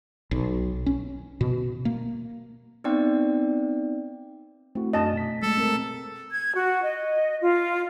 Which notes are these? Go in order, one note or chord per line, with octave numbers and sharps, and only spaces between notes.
B1
C#4
B2
A#3
B3 C4 D#4 D5 G5
A3 C4 E4 F#4
F#2 D4 F#4 D#5 A5
B2 B6
G#3 A3 A4
C4 A#4
G#6
F#4
D#5
F4